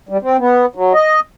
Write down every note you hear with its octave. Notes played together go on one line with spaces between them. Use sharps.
G3
C4
B3
F#3
D#5